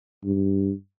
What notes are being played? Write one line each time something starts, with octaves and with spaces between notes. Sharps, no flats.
G2